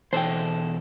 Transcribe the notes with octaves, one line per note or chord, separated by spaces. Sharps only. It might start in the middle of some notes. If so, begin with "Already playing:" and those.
E2 B2 A4 C5 G5